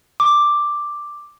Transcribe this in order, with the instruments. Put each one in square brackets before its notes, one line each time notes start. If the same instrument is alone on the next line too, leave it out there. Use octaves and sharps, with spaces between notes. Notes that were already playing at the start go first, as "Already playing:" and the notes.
[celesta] D6